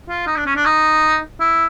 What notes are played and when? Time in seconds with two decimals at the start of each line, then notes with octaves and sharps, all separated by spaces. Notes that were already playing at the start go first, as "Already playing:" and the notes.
0.09 F4
0.27 D#4
0.37 D4
0.46 C#4
0.56 D4
0.66 D#4
1.40 E4